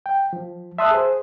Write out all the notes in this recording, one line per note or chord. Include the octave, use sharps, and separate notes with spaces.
G5
F3
E5 A5 C6 D#6 E6 F#6
G#4 C5